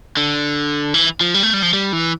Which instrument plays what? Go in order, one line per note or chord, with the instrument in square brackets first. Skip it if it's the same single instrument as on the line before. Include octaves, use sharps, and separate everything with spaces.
[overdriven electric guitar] D3
E3
F3
G3
A3
G3
F3
G3
E3